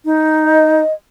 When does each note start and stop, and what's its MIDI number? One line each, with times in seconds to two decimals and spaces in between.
0.05 0.81 63
0.45 0.93 75